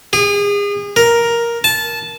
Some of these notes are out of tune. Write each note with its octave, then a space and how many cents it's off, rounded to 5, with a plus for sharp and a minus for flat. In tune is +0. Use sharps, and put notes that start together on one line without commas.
G#4 -35
A#4 +5
A5 -15